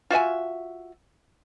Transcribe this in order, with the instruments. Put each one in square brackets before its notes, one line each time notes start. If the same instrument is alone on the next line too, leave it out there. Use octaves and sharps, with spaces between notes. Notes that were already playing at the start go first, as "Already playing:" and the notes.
[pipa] F4 F#4 E5 G#5